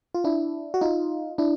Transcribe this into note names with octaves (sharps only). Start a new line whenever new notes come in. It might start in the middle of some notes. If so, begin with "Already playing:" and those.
F4
D4 E4
F#4
D#4 F4
D4 E4